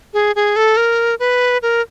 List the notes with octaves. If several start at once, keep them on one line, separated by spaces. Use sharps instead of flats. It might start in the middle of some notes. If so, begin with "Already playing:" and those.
G#4
G#4
A4
A#4
B4
A#4